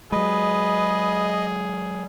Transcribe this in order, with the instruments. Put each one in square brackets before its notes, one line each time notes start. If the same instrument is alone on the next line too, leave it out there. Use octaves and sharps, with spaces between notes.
[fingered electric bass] F#3 G#3 [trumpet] G#4 [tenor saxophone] B4 [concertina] D#5